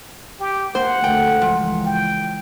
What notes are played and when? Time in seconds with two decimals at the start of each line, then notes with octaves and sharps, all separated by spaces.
0.40 G4
0.75 A#3 C5 F#5
1.04 D2 A3 G5
1.42 C#2 E3 F3
1.86 G5